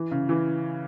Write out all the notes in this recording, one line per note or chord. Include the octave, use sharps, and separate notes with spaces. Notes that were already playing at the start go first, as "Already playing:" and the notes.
Already playing: E3
C#3
E3